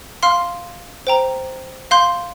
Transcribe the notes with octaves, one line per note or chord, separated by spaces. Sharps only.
F5 C6 F6
C5 G5 A#5
F5 C6 G6